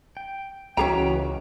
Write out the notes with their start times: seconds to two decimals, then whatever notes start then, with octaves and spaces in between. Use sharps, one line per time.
0.17 G5
0.77 C#2 E3 C#4 F#4 G#4 G5 A#5